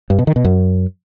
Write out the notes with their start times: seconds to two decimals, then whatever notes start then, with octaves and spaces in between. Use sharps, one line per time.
0.10 G2
0.19 B2
0.27 D#3
0.36 B2
0.45 F#2